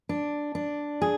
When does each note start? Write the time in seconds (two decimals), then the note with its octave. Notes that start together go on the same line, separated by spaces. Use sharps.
0.09 D4
0.55 D4
1.02 G#4